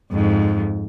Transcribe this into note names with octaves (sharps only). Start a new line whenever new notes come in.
F2 G#2